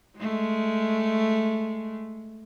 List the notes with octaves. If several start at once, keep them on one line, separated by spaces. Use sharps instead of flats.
G#3 A3